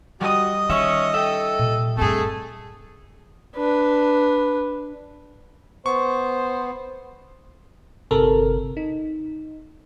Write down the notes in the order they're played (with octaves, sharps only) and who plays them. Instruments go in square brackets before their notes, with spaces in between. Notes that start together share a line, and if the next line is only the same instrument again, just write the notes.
[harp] G3 D#6 [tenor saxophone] F#4 [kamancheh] D#5
[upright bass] D#3 [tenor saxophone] C#4 [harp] E5 C#6
[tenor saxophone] A4 [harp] E5 G5
[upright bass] A#2
[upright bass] G2 C4 [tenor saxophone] A3 [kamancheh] G#4 A4
[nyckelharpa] D4 B4
[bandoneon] B3 [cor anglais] C5 [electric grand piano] C#6
[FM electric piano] G1 C3 A4 A#4
D#4